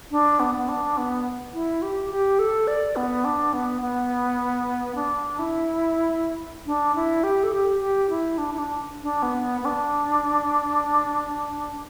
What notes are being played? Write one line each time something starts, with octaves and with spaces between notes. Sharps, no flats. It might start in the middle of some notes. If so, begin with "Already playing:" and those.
D4
B3
B3
D4
B3
E4
G4
G4
A4
D5
B3
D4
B3
B3
D4
E4
D4
E4
G4
A4
G4
G4
E4
D4
E4
D4
D4
B3
B3
D4